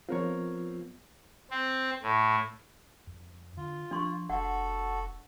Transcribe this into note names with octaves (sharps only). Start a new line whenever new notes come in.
F3 B3 C4 F4 A#4 C#5
C4
A2
F2
D3 F4
F3 D4 C6 C#6
F1 F#4 A4 F#5